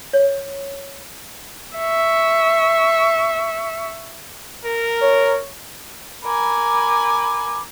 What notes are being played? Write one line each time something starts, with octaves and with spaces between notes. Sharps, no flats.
C#5
E5 C#6
A#4
C#5
A#4 G#5 B5 D6